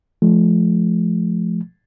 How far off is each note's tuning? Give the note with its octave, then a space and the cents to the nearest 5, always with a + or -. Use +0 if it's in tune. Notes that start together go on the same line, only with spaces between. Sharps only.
F3 +0 A3 -30